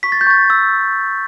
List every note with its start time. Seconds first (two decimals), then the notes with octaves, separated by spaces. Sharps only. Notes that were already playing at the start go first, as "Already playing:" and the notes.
0.03 C#6 B6
0.12 A6
0.21 G6
0.27 C#6 A6
0.50 E6